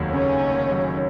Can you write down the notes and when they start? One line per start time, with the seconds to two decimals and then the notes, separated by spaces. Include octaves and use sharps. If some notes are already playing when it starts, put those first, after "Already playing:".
Already playing: F1 D#2 F#3
0.13 C#3 C#4
0.42 F1
0.72 F#3